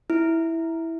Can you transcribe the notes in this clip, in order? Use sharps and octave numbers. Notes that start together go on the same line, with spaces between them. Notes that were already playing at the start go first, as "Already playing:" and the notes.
E4